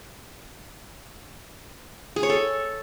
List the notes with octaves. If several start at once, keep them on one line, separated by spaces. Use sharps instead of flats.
G#4
C#5
A4